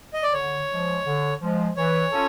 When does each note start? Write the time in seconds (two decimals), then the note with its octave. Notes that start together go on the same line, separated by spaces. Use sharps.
0.14 D#5
0.23 D5
0.33 D3 C#5
0.70 F3 G#3
1.05 D3
1.41 F3 G#3
1.77 E3 C#5
2.12 C#4 F4 A4